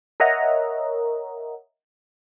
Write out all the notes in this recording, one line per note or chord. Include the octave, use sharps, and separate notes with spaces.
A#4 C#5 D#5 E5 F#5 A#5